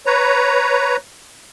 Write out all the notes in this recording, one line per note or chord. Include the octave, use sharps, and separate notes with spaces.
B4 C#5 A#5